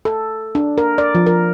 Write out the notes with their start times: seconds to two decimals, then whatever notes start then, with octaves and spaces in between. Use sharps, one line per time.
0.05 A4
0.55 D4
0.78 A#4
0.98 D5
1.15 F3
1.27 A#4